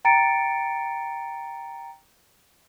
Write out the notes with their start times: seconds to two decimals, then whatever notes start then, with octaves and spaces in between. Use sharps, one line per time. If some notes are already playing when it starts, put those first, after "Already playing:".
0.05 G5 A#5 A6 C#7 D7